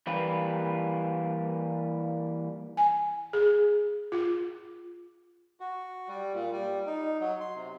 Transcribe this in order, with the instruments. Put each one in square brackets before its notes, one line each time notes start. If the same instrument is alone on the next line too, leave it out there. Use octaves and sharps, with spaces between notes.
[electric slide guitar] E3 G3 A#3 B4
[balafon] G#5
G#4
F4
[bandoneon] F#4
G3
A#2
G3
D#4
F#3
C6
C3